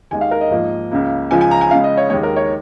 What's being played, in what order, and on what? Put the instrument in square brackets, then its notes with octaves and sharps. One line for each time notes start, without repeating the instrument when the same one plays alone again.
[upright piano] D#2 D#3 G#3 G#5
F5
A#4
D#5
G#2 F3 A#3
C#2 C#3 A#3
C#2 C#3 F3 G#5
G#5
A#5
G#5
C#2 C#3 G#3 F5
D#5
C#5
D#2 D#3 G#3 C#5
A#4
C#5